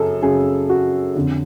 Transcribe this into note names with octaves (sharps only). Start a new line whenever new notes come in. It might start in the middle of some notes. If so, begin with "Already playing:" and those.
Already playing: F#2 C#3 G#4 A4
F#2 C#3 G#4
F#4
F2 D3